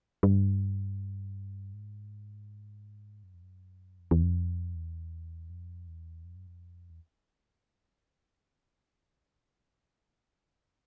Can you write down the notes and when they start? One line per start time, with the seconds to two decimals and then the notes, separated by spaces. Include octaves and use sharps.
0.23 G2
1.74 G#2
3.23 F#2
3.34 F2
3.43 F#2
3.99 F2
4.11 E2
4.23 F2
4.75 E2
5.50 F2
5.87 E2
6.24 F2
6.36 F#2
6.47 F2
6.90 E2